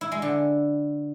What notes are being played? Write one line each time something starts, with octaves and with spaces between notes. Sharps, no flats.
E4
G#3
D3